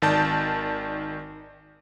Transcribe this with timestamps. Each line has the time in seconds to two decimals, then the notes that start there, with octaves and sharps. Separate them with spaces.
0.02 G#1 D#3 D5 A5 G6